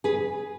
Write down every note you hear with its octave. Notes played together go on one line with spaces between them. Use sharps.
G#4 B4